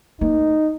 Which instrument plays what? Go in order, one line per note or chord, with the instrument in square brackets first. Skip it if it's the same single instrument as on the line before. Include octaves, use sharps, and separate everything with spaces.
[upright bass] A#3 [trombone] D#4